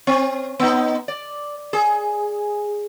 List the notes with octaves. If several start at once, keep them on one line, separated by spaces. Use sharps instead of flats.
C4
B3 D#4
D5
G#4